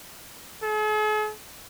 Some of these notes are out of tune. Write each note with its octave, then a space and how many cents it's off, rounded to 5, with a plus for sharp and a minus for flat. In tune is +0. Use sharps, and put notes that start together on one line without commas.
G#4 +45